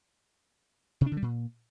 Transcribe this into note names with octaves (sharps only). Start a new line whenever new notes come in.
C3
D4
D3
G3
A#2